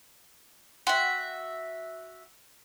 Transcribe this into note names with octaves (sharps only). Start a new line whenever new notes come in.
F#4 E5 F#5 G5 C6